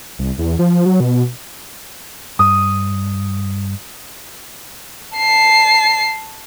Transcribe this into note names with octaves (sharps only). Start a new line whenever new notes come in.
C2
E2
F3
F#3
B2
G2 D#6
A5 C7